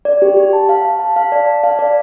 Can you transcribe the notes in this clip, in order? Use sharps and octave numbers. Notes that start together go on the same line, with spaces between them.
D5
G4
G4
A5
F5
F5
A5
F5
D5
A5
F5
D5